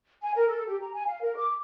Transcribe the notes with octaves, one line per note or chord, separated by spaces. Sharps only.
G#5
A#4
A4
G4
A#5
G#5
F5
A#4
D6